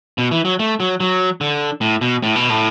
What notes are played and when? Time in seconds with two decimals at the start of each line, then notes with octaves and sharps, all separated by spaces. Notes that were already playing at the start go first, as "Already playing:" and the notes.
0.18 B2
0.31 E3
0.45 F#3
0.59 A3
0.80 F#3
1.00 F#3
1.41 D3
1.81 A2
2.01 B2
2.23 A2
2.35 B2
2.50 A2